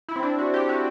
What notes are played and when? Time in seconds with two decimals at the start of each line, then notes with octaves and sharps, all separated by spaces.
0.09 E4
0.16 C4
0.23 D4
0.39 F#4
0.54 G4
0.69 F#4